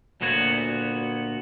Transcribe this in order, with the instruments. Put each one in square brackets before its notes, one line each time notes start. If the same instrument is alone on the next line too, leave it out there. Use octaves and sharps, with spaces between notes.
[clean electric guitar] D2 A#2 B3 F#4 C#5